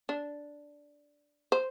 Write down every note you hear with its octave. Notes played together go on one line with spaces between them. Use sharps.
D4
C5